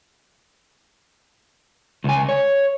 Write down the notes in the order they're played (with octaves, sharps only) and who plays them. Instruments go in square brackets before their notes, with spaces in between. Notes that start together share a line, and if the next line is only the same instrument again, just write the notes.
[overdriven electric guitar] C#2 G#5
C#5